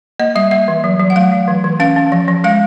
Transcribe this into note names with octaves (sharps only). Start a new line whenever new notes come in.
A#3 D#5
G3 E5
A#3 E5
E3
F#3
F#3
F#5
A3 F5
F#3
E3
E3
C#4 F5
C#4
F3
F3
G#3 F5